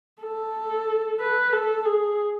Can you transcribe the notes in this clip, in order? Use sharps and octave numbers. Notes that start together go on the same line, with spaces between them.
A4
B4
A4
G#4